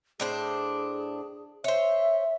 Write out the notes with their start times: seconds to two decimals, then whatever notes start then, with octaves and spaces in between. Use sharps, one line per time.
0.20 A2 D4 G#4 C5
1.64 C5 C#5 E5